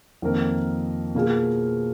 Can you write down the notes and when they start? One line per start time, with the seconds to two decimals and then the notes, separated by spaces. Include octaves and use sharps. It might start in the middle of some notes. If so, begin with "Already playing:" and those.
0.22 F2 D#3 A#3 D#4 A#4
1.15 B2 A#3 F4 G#4